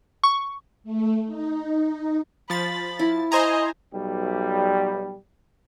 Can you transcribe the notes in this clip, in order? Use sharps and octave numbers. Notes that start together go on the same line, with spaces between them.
C#6
A3
D#4
F3 B5 A6
E4
C5 D#5 G#5 A#5
B1 G3